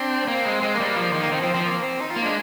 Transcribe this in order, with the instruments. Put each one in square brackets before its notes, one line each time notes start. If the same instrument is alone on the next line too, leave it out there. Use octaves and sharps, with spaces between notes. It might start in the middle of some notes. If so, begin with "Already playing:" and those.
Already playing: [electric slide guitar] C4 [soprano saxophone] D4
[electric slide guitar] A#3 [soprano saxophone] C4
[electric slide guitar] G#3
[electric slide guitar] G#3 [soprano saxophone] C4
[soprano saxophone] A#3
[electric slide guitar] G3
[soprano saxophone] A#3
[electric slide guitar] F3
D#3
[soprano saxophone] A#3
[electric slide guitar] D#3 [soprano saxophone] C4
[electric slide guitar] F3 [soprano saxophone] C4
[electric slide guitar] F3 [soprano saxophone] C4
[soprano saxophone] A#3
C4
D#4
F4
[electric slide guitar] A#3
[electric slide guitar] G#3 [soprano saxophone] D4